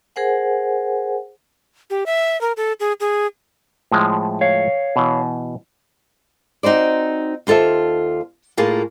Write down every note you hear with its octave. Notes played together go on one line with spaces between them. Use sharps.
G#4 A#4 C5 F#5 G#5
G4
E5
A#4
A4
G#4
G#4
A2 F3 G#3
C#5 F5
B2 E3
C4 D#4 F#4 C5 D5
D#2 F4 A4 C5 E5
A2 A#3 F4 G#4